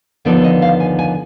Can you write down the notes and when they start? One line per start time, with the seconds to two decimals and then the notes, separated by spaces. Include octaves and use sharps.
0.25 D#2 D3 F3 B3 D#4 D5
0.44 D#5
0.62 F5
0.80 G#5
0.99 G#5